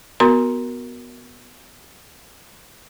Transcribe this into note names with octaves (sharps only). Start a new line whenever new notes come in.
B3 F#4 A#4 A#5 C6